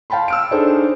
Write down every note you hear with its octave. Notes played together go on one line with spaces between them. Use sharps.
F5 G5 A5 B5 C6
E6 F6 D7
D4 D#4 G#4 A4 C5 C#5